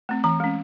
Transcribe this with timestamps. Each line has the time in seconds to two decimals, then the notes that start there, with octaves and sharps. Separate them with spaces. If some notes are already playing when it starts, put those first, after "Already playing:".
0.09 A3 C4
0.24 E3 A#5
0.40 G#3 C#4